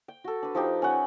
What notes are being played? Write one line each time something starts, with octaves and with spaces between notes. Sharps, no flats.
G5
F#4 A4
D4 B4
F3 D#4 G4
C#4 F#5 G5